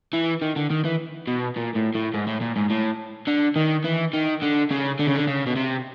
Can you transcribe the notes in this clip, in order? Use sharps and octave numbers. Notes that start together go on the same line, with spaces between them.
E3
D#3
D3
D#3
E3
B2
A#2
A2
A2
G#2
A2
A#2
G#2
A2
D3
D#3
E3
D#3
D3
C#3
D3
C#3
D3
C#3
B2
C3